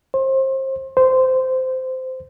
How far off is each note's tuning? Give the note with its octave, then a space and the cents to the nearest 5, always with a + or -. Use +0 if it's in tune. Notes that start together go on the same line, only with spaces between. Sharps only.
C5 +30
C5 -15